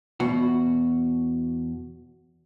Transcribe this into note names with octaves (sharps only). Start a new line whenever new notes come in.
E2 B2 F#4